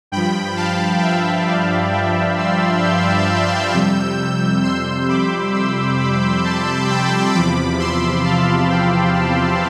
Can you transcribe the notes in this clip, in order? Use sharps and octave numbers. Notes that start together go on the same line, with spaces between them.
G2 F3 G5 B5
F5 A5
E5 G5
D5 F5
E5 G5
C6 E6
E6 G6
F2 C3 G3
C6 E6
B5 D6
C6 E6
B5 D6
A5 C6
G5 B5
E2 C3 F3 B5 D6
C6 E6
F5 A5
G5 B5
F5 A5